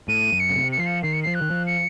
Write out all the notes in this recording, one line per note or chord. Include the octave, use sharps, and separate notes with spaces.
A2 D#7
F#2
C#7
C#3
C3
C#7
F3 C7
C#7
D#3 C7
C#7
F3 C7
F#6
D#3
F3
C#7